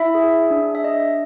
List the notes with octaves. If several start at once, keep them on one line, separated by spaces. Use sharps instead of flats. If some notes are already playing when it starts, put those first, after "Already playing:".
Already playing: E4 E5
G#4
D4
E5
D4 D#5